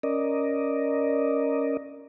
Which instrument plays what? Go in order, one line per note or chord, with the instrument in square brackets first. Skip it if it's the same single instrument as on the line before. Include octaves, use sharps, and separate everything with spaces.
[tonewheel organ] C#4 A#4 D5 D#5